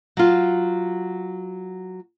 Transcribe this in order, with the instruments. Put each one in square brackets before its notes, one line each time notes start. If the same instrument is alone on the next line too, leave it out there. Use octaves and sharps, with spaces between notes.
[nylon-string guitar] F#3 F4